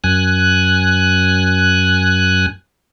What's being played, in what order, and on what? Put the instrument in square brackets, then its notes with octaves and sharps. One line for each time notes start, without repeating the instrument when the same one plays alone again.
[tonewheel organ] F#2 G#5 F#6